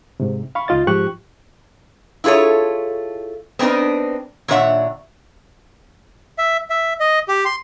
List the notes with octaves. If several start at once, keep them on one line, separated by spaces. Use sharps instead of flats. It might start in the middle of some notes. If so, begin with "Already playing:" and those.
G#2 C3
F5 B5 C#6
C#2 D#4 F4 D#5 A6
G#2 F3 G4 C#6 F#6
E4 F4 G#4 A4 C#5
B3 C4 D4 D#4 A#4
A#2 D#3 D4 C#5 E5 F#5
E5
E5
D#5
G4
C6